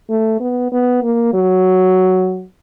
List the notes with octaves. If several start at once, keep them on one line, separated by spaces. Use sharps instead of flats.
A3
B3
B3
A#3
F#3